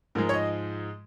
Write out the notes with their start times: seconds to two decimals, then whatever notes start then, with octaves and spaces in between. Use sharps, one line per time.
0.15 G#2 F3 G#3 A#4
0.29 C#5
0.34 D#5